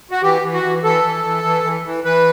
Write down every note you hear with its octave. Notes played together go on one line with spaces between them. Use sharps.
F#4
E3 G4
E3
F#4
E3
E3 A4
E3
E3
E3
E3
E3
E3 B4